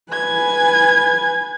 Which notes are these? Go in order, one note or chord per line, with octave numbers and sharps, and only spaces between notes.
B4 G#5 G#6